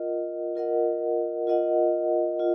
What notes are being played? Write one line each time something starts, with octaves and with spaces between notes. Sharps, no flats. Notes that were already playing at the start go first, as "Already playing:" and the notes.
Already playing: F4 A#4 D#5 F#5
F4 A#4 D#5 F#5
F4 A#4 D#5 F#5
F4